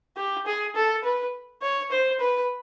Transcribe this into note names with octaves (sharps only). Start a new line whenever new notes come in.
G4
G#4
A4
B4
C#5
C5
B4